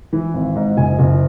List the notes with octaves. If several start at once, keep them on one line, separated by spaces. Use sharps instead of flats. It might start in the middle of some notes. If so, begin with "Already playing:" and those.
E3
G#1
G#2
F#1 G#5
F#1